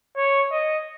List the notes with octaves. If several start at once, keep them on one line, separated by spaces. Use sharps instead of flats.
C#5
D#5